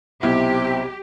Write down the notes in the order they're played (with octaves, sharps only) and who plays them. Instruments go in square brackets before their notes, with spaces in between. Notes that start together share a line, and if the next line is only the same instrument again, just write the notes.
[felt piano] B1 [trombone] C3 [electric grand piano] E4 [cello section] G4